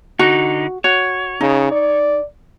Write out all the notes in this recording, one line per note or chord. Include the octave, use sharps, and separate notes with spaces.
D3 D#4 F#4
F#4 C#5
C#3 D#4
D5